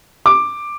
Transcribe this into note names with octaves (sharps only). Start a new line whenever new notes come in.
D6